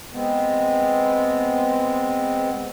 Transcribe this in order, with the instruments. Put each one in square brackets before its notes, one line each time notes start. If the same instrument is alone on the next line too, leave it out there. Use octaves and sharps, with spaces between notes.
[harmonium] G#3 B3 C4